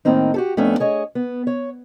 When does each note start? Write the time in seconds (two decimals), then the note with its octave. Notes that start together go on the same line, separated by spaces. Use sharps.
0.05 A2 D#3 A#3 C4 D#4
0.34 F#4 G4 A4
0.57 F2 A3 B3 C#4 D4
0.80 G#4 C#5 D#5
1.15 B3
1.47 C#5